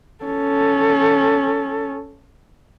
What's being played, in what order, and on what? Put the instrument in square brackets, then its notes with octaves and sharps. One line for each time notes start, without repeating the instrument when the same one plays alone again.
[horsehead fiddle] C#4 A4